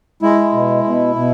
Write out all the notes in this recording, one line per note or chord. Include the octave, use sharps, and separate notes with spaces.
G#3 E4
B2
B2
B2